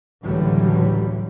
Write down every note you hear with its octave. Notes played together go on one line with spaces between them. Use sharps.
C#2 A2 D3 E3 F#3 G3